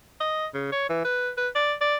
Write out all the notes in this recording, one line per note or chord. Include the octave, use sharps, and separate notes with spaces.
D#5
C#3
C#5
E3
B4
B4
D5
D5